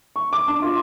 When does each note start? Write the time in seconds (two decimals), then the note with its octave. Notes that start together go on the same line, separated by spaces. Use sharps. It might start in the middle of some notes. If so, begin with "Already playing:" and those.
0.16 C#6
0.33 D6
0.48 D4
0.62 F4